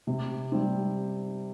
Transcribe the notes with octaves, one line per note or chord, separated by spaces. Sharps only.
C3
G3 C4